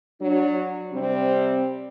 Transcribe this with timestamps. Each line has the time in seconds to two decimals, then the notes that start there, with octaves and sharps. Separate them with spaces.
0.20 F#3 D4
0.92 C3 G3 C4